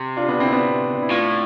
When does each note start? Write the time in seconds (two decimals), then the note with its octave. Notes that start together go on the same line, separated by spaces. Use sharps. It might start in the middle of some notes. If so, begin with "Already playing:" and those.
Already playing: C3
0.17 D4 F4
0.28 B3 D4
0.40 C4 E4
0.52 B3 D4
0.95 D4
1.02 E4
1.10 A2 D4 F4